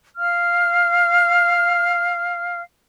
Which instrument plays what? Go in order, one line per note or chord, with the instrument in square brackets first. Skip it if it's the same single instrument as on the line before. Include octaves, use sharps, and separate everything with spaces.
[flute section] F5 F6